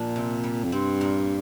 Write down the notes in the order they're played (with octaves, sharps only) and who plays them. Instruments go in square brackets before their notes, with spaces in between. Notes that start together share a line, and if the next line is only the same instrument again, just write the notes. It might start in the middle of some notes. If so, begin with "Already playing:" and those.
Already playing: [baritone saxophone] A#2 [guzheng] F3 D4
[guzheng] C3
G3
[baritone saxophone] F2
[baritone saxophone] G2 [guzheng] C4
[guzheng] A#2